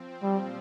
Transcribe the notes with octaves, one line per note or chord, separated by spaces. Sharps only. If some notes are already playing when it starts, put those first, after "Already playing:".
Already playing: F3 C4
A#2 G3